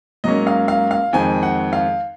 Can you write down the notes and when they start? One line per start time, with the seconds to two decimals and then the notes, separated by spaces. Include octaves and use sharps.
0.24 G#2 F#3 A#3 C#4 D#5
0.47 F5
0.68 F5
0.91 F5
1.13 F2 D#3 G#3 C4 G#5
1.43 F#5
1.73 F5